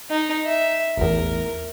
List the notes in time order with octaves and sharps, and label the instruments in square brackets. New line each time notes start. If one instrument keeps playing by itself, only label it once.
[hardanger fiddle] D#4
E5
[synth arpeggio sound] A1 E2 [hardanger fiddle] A#4